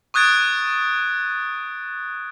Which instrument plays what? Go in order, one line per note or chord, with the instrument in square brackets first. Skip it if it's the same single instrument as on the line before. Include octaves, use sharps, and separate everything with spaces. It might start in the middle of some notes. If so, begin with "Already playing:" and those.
[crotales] C#6 D#6 F#6 G#6 A6 D7